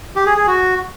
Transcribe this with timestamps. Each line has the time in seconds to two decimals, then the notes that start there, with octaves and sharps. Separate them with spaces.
0.16 G4
0.26 G#4
0.37 G#4
0.47 F#4